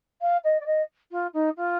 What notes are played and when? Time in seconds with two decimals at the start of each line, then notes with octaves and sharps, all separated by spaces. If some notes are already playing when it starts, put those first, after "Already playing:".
0.21 F5
0.44 D#5
0.60 D5
0.66 D#5
1.11 F4
1.34 D#4
1.57 F4